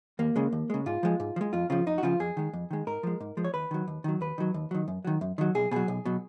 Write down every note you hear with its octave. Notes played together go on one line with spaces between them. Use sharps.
D#2 A#3
C#3 G#3
D#2
C#3 G#3
G#2 F4
F3 G#3
G#2
F3
G#3
F2 F4
C#3 F3 F4
F2 D#4
F#4
C#3 F3 F4
F2 G#4
D#3 G#3
F2
D#3 G#3
G#2 A#4
F3 G#3
G#2
F3 G#3
C#5
D#2 B4
D#3 F#3
D#2
D#3 F#3
D#2 B4
D#3 F#3
D#2
D#3 F#3
F#2
D#3 F#3
F#2
D#3 F#3
B1 G#4
B2 F#3 G#4
B1
B2 F#3